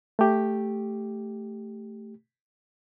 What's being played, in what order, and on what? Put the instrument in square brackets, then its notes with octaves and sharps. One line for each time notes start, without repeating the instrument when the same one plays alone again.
[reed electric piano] A3 G4